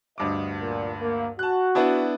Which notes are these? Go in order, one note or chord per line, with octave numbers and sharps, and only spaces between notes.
D2 G2 D#5 D6
A#2
A#3
F#4 A5 F#6
B3 D4 E4